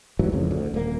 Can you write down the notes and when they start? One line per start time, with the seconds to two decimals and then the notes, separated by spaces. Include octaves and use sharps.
0.19 A1 G#2 E3 F#3
0.32 A1 F2 C#3
0.51 D2
0.74 D#1 A#3